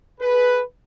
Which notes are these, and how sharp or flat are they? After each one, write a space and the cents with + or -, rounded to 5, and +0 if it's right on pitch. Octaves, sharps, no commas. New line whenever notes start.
G#4 +40 B4 +0